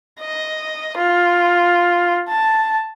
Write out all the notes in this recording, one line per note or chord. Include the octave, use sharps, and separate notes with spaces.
D#5
F4
A5